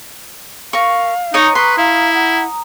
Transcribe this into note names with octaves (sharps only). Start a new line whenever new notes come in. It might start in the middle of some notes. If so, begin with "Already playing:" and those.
A#4 F5 C#6
D#4 C#5 D#5 A#5 D#6
B4 C6 C#6
E4 F5
F#5